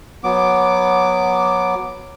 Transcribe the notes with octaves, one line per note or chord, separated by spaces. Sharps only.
F#3 B3 D6